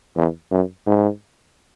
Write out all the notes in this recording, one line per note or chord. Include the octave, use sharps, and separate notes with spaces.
E2
F#2
G#2